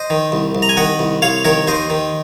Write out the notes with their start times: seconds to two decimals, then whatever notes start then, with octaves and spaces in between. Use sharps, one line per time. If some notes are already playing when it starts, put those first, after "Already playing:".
Already playing: C5 D#5
0.10 D#3
0.32 C2
0.55 C2
0.62 A#5
0.69 G#5
0.77 D#3 D#5 F#5
0.99 C2
1.22 C2 C#5 F5
1.45 D#3 A#4 C#5
1.67 D#2 C5 D#5
1.90 D#3